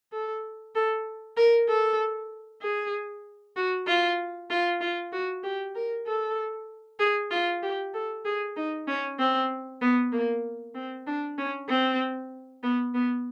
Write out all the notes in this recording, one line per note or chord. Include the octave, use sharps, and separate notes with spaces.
A4
A4
A#4
A4
G#4
F#4
F4
F4
F4
F#4
G4
A#4
A4
G#4
F4
G4
A4
G#4
D#4
C#4
C4
B3
A#3
C4
D4
C#4
C4
B3
B3